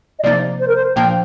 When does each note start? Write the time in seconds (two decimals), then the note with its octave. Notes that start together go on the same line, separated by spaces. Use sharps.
0.19 D#5
0.23 C3 F3 A#3 D#4 D5
0.60 C5
0.68 A#4
0.75 C5
0.96 A#2 F3 A#3 D4 G5